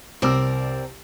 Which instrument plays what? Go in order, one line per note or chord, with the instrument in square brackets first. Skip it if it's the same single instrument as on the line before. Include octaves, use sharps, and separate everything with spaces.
[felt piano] C2 E6 [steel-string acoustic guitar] C4 A#4 D5